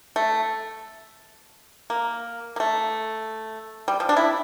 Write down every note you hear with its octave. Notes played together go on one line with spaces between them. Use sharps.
A3
A#3
A#3
A3
G3
F3
D4
E4